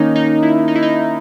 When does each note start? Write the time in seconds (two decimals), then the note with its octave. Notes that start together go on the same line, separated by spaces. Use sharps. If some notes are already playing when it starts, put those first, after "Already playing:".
Already playing: D#3 A#3 C#4 D#4
0.16 D#4
0.43 E4
0.68 D#4
0.76 E4
0.83 D#4